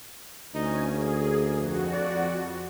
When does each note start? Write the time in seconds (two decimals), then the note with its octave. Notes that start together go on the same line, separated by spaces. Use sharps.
0.55 D2 C#4 D#4 G#5
0.89 A#3 G#4
1.55 F2 F#4
1.93 D5